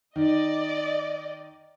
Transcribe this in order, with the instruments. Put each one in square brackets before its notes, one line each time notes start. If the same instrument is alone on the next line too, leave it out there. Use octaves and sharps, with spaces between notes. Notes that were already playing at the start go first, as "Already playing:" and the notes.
[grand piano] D#3 [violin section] D5 D#5